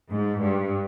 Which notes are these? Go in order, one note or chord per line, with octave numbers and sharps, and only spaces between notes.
G#2
G2